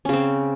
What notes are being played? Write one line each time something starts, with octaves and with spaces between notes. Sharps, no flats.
C#3 C4 C#4